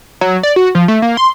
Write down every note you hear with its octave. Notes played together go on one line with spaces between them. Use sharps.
F#3
D5
F#4
F3
A3
A#3
C6